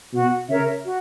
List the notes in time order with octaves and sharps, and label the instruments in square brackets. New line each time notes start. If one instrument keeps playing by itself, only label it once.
[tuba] B2 [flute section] F#4
[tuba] C#3 [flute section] A#4 C#5 E5
[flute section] F#4